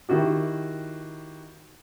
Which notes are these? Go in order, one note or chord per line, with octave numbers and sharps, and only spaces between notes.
D#3 E4 F#4 G4